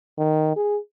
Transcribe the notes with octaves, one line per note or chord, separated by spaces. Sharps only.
D#3
G#4